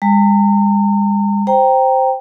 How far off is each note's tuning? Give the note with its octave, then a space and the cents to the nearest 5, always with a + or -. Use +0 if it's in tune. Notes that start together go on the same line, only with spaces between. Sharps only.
G#3 -45 A#5 -40
C5 +0 G5 +0 A#5 +0